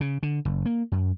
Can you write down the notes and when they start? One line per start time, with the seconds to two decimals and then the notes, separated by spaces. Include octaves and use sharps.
0.01 C#3
0.23 D3
0.45 F#1
0.66 A#3
0.92 F#2